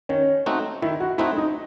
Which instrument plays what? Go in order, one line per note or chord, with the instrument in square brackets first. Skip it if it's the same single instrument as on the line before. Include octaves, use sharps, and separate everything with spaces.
[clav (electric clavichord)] D#3 [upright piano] C#4
[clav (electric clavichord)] A3 C4 D#4 F#4
[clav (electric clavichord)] D#3 [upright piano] E4
[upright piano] F#4
[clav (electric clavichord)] A3 C4 D#4 F#4 [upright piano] E4
[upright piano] D#4